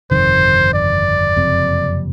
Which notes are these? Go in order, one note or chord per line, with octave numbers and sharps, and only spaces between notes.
G1 F2 C3 D#3 C5
D5
F#1 F2 C3